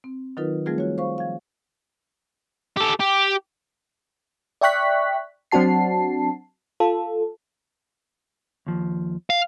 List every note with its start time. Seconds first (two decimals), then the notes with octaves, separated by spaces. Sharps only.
0.04 C4
0.37 D#3 F#3 D#4 F4 A#4 B4
0.66 F3 G3 A3 C4 F4 G#4
0.78 F#4 C#5
0.98 C5 F5 C#6
1.18 F3 F5
2.77 G4 A4
3.00 G4
4.61 D5 E5 G5 C#6 F#6 B6
5.52 F#3 C4 D4 F#4 A5 C7
6.80 F4 A4
8.67 D#2 F3
9.30 F5